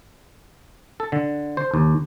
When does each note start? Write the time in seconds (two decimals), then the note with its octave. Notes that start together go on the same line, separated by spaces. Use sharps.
1.00 A4
1.12 D3
1.57 C5
1.74 D#2